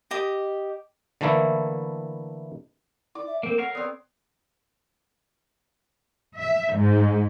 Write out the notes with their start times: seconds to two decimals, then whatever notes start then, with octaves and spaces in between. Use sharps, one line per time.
0.11 G4 D#5 D6
1.21 D3 E3 A3 A#3 E4
3.15 E4 D5 D6
3.27 E5
3.43 A#3 C4 A4 A#4
3.58 A#4 C#5 F5 F#5
3.75 B3 C4 D5
6.37 E5
6.75 G#2